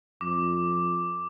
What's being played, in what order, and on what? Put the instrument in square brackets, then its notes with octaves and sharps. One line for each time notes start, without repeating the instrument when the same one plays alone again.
[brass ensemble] F2 [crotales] D6